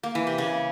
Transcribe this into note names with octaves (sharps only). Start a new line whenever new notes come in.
A#3
E3
C3
C#3